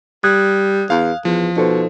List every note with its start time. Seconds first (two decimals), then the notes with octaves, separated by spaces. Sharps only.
0.24 G3 D#6 F#6 G#6
0.90 E2 F5
1.25 E2 F3
1.56 B2 D#4 A4 C5